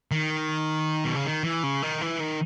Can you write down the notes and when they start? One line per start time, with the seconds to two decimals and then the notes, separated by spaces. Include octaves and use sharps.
0.11 D#3
1.05 B2
1.15 C#3
1.25 D#3
1.43 E3
1.63 C#3
1.82 D#3
2.01 E3
2.20 D#3